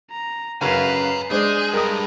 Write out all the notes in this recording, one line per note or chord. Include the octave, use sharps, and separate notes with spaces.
A#5
F#2 C#3 B4 F5 G#5 A#5
G#3 D4 G#4 C5 G6
G2 A#4 D#5 D#6